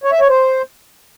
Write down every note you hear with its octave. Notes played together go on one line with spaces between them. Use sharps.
C#5
E5
C#5
C5